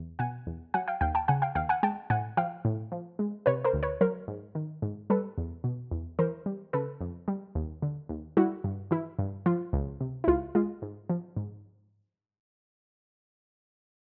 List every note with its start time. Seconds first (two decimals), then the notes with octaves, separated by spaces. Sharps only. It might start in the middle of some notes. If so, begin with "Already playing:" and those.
Already playing: E2
0.19 B2 F#5 G#5
0.47 E2
0.74 F#3 F#5 G#5
0.88 F5 G5
1.01 D#2 F5 G5
1.15 G5 A5
1.28 C#3 F#5 G#5
1.42 F5 G5
1.55 D#2 F5 G5
1.69 F#5 G#5
1.83 G#3 G5 A5
2.10 A2 F#5 G#5
2.37 F3 F5 G5
2.65 A2
2.92 F3
3.19 G#3
3.46 C3 B4 C#5
3.64 A#4 C5
3.73 D2
3.83 B4 C#5
4.01 F#3 A#4 C5
4.28 G#2
4.55 D#3
4.82 G#2
5.10 G3 A4 B4
5.38 E2
5.64 B2
5.91 E2
6.19 E3 A#4 C5
6.46 G3
6.73 C#3 A4 B4
7.01 F2
7.28 G3
7.55 D#2
7.82 D3
8.09 D#2
8.37 G3 E4 F#4
8.64 G2
8.91 E3 E4
9.19 G2
9.46 F3 F4
9.73 C#2
10.01 C3
10.24 E4
10.28 C#2 F4
10.55 G#3 F4
10.82 G#2
11.09 F3
11.37 G#2